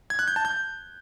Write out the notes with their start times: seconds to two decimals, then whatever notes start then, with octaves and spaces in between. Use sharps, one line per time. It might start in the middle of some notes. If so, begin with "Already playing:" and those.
0.10 G#6
0.19 F#6
0.28 G6
0.36 A5
0.45 G6